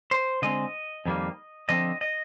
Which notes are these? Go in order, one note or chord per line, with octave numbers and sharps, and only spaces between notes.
C5
D3 G#3 C4 D#5
F2 D#3 G3 A#3
D3 F3 C4 D#5
D#5